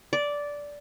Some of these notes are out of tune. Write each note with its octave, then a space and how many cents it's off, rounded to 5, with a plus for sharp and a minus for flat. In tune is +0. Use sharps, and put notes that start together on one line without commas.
D5 -10